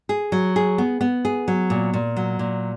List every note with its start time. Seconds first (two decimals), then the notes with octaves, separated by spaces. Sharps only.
0.09 G#4
0.32 F#3
0.56 G#4
0.78 B3
1.01 B3
1.25 G#4
1.48 F#3
1.70 A#2
1.94 A#2
2.16 F#3
2.39 A#2